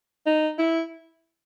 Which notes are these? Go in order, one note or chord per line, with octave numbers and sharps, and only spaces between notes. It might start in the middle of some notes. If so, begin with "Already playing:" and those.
D#4
E4